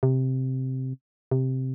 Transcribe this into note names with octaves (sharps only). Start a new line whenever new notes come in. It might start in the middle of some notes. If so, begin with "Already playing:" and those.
C3
C3